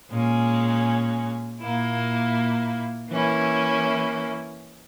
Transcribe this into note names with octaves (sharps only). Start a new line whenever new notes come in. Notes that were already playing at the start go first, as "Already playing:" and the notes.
A#2 G#3 C#4
A#2 A#3 E4
E3 A#3 C#4 E4